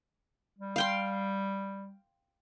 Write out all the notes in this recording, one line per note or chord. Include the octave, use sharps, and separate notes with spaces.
G3
F5 G5 C6